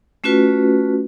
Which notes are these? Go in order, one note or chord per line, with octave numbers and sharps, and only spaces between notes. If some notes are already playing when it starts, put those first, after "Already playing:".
A3 C#4 F4 F#4 B4